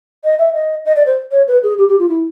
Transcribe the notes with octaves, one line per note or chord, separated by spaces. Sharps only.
D#5
E5
D#5
D#5
D5
C5
C#5
B4
G#4
G4
G4
F4
E4